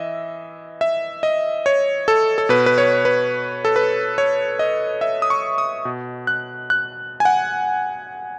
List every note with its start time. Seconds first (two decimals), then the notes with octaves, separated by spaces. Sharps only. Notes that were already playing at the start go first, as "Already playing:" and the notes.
Already playing: E3 D#5 E5
0.81 E5
1.23 D#5
1.66 C#5
2.08 A4
2.38 A4
2.49 B2 B4
2.66 B4
2.78 C#5
3.05 B4
3.65 A4
3.76 B4
4.18 C#5
4.59 D#5
5.01 E5
5.22 D#6
5.30 C#6
5.58 D#6
5.85 B2
6.27 F#6
6.70 F#6
7.20 G#5
7.25 F#5